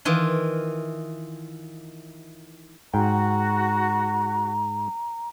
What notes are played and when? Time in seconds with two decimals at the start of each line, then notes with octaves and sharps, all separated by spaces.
0.05 D#3 E3 F4
2.94 G#2 F#4 G5 A#5